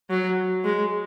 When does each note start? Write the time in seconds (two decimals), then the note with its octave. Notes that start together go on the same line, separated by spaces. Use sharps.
0.10 F#3
0.64 G#3